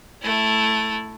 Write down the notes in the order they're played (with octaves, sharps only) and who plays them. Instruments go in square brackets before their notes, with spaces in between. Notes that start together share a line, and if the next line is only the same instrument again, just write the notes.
[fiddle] A3 E4